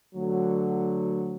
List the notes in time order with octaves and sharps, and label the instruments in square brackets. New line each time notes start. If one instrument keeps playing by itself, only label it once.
[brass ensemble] D2 D3 F#3